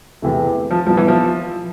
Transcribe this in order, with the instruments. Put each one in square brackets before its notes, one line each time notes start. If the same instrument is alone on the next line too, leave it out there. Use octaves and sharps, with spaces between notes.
[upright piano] E2 C3 E3 A3
[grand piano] F3
[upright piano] C2 B2 B3 E4 [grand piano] F3
[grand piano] E3
F3